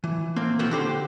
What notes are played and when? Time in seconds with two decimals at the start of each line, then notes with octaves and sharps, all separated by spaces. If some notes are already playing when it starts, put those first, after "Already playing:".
0.04 E3
0.36 A#3 C4 F5
0.59 B2 D#3 F3 B3 C4
0.71 D3 G4 C5